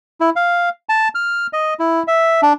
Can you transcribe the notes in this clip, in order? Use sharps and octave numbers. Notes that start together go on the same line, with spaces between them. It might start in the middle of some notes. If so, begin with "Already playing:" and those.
E4
F5
A5
F6
D#5
E4
E5
D4